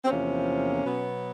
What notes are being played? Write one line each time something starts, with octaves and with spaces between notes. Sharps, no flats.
C4
E2 C3 F3 A#3 C#4
B2 F#3 B3